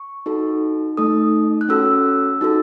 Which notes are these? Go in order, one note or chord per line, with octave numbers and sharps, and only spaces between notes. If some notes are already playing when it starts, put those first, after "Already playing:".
Already playing: C#6
D#4 F#4 A4
A3 D#4 A4 D#6
F#6
C#4 F#4 A4 E6
D#4 F#4 A4